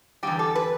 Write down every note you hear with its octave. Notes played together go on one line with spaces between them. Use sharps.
E2 D3 G3 G4
A4
B4